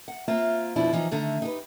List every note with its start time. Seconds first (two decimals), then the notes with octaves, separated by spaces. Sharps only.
0.08 F#5
0.28 A#3 C4 F4 E5
0.76 F2 B2 F3 D4 E4
0.93 E3 F3 D#4
1.11 D3 D#3 A3
1.42 D#4 G4 B4